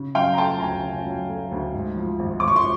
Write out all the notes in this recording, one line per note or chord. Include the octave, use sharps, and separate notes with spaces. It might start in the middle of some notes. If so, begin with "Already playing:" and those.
Already playing: C#3
F#3 F5 G5
A#5
A3 G5 A5
A5
D2 G#5 A#5
C#3
F#3
A3
D2
G#2
F3
G#1
G#1 D6
C#6
C6